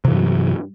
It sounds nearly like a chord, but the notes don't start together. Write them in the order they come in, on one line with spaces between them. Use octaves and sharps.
C3 E3 G2 F#3